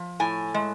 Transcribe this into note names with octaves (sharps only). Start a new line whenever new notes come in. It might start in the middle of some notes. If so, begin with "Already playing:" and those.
Already playing: F3
A2 G#5
G#3